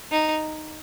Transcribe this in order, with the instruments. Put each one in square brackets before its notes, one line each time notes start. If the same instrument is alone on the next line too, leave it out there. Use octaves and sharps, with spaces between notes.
[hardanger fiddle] D#4